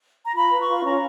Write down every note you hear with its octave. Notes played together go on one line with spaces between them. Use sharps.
A#5
F4 B5
B4
C#6
F4
C#4 A#5